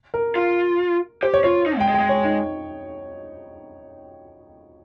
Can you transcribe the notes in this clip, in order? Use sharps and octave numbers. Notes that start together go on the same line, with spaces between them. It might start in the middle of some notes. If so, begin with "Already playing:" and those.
A#4
F4
G4 C5
C#5
F4 C#5
D#4
G#3
G5
G#3
G5
G#3
C#5
D#4